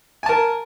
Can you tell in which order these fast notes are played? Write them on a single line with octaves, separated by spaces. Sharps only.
G#5 A5 A#4